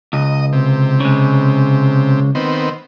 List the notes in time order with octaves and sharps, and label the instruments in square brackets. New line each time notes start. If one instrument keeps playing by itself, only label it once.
[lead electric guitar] C#2 [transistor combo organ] D#5
[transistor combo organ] C3
[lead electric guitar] C#3 G#3
[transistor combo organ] D#3 B3 C4